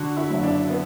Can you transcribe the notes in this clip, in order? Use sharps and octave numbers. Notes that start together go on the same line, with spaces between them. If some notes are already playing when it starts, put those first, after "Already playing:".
Already playing: D3 F#4
E4
F#1
D4
B3